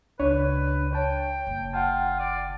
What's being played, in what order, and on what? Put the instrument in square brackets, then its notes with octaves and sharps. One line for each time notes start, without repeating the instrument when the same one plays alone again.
[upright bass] C#2 [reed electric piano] D4 C#5 [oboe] B4
[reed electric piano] C#5 A5 [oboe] G5
[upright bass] F#1
[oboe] F4 [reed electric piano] F#5 G5 A5
[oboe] D5